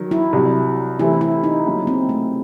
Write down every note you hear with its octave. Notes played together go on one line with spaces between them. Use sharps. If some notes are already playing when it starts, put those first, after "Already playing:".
Already playing: D#3 F#3
E4
C2 C3 F#3
C3 E3 A3 C4 E4
E4
D#4
D#2 C#3 F#3 C#4
C4
A3